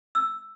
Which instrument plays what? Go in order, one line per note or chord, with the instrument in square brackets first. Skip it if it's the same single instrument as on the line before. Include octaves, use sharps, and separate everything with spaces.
[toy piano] E6